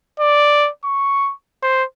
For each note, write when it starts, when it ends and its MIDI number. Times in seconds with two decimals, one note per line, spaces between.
0.20 0.69 74
0.84 1.32 85
1.63 1.84 72